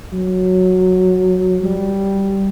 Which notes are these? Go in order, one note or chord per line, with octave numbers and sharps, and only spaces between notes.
F#3
G3